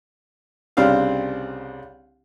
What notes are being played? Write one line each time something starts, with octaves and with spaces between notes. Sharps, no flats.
C2 C#3 C4 D4 F5